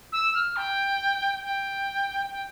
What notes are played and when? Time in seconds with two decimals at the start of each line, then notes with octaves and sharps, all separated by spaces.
0.12 E6
0.34 F6
0.56 G5
1.44 G5
2.31 G5